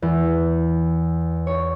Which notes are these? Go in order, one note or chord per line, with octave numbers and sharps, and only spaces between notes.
E2
C#5